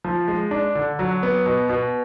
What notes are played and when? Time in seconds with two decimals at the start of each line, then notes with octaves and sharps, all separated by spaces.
0.04 F3
0.28 G#3
0.51 D4
0.75 D3
0.99 F#3
1.23 B3
1.46 B2
1.69 B2